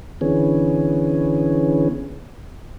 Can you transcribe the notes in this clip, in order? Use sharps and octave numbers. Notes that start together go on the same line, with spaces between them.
D3 E3 B3 C#4 G#4